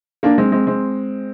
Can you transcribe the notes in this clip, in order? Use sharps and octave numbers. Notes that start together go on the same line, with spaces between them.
A#3 D4
G#3 C4
G#3 C4
G#3 C4